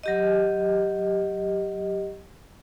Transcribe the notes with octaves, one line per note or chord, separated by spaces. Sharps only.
F#3 G4 D#5